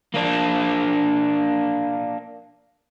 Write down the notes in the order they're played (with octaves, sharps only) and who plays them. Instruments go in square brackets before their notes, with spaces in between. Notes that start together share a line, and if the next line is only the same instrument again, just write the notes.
[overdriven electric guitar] A#3 D4